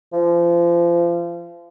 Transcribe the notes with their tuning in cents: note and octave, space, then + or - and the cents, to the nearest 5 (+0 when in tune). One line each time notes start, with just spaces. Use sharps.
F3 -30